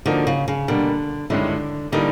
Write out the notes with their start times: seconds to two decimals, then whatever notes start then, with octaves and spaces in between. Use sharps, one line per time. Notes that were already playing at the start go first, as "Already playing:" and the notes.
0.06 D3 F3 A#3 D#4 F#4
0.27 C#3
0.48 C#3
0.68 B2 D3 G3 A#3
1.30 G2 D3 D#3 G#3 C#4 E4
1.92 D3 E3 G3 A#3 D#4